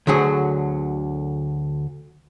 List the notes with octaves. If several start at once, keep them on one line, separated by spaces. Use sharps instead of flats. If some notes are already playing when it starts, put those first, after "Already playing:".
D2 D3 F#3 G#4